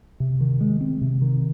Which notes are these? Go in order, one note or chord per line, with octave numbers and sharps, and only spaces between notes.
C3
D#3
G#3
C4
C3
D#3